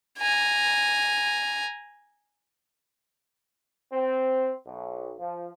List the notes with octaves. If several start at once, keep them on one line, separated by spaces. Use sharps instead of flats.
G#5 A#5
C4
B1
F3